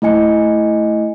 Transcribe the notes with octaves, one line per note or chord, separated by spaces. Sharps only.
A3 E4 D#5 G#5 C#7